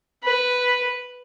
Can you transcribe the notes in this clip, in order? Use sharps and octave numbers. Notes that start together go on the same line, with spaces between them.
B4